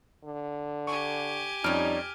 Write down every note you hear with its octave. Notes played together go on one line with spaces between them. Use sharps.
D3
G4 G#5 C#6
F2 G3 C#4 D#4 F6 D7